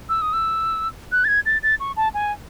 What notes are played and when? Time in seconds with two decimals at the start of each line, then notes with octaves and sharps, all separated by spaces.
0.09 E6
0.22 D#6
0.33 E6
1.12 F#6
1.24 A6
1.28 G#6
1.46 A6
1.63 A6
1.80 C#6
1.97 A5
2.14 G#5